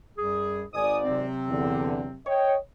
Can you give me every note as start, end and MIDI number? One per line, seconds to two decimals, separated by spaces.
0.18 0.63 42
0.18 0.63 55
0.18 0.63 68
0.74 1.25 32
0.74 1.25 44
0.74 1.25 74
0.74 0.98 80
0.74 0.98 87
1.05 2.19 48
1.05 2.19 54
1.05 2.19 60
1.49 2.06 40
1.49 2.06 50
2.27 2.57 73
2.27 2.57 75
2.27 2.57 79